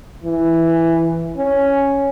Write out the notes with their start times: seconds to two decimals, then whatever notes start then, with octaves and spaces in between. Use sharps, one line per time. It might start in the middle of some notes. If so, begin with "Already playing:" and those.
0.24 E3
1.38 C#4